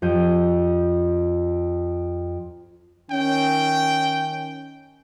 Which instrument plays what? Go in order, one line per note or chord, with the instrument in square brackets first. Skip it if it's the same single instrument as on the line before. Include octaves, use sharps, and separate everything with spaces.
[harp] F2 G4 G6 D#7
[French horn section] D#3 C#4 [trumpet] G5